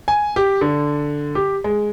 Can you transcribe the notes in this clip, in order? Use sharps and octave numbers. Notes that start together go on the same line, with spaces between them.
G#5
G4
D3
G4
G#3